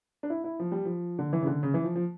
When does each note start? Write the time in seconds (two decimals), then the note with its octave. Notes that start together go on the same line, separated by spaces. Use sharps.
0.23 D4
0.30 E4
0.44 E4
0.60 F3
0.72 G3
0.85 F3
1.19 D3
1.33 E3
1.42 C#3
1.47 D3
1.63 C#3
1.74 E3
1.84 F3
1.96 F3